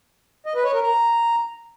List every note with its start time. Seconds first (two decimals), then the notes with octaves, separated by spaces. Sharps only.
0.46 D#5
0.55 B4
0.65 C#5
0.74 A#4
0.83 A#5